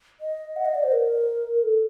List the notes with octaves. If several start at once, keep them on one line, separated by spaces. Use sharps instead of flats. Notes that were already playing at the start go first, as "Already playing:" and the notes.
D#5
F#5
D#5
D5
C5
A#4
A4